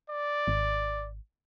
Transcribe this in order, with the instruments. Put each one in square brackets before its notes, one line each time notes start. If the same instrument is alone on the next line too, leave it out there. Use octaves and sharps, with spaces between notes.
[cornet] D5
[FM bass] G#1